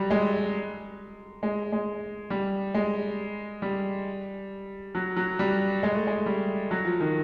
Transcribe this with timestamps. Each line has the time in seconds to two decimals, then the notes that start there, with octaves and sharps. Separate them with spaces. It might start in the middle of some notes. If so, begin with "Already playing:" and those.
Already playing: F#3 G3
0.10 G#3
1.43 G#3
1.72 G#3
2.30 G3
2.74 G#3
3.62 G3
4.95 F#3
5.16 F#3
5.39 G3
5.83 G#3
5.95 A3
6.07 G#3
6.26 G3
6.71 F#3
6.85 F3
7.00 D#3